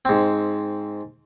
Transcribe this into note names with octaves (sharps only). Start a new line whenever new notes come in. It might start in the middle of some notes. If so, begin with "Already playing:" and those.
G#2 C4